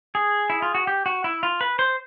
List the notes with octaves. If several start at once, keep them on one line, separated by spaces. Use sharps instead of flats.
G#4
E4
F4
F#4
G4
F#4
E4
F4
B4
C5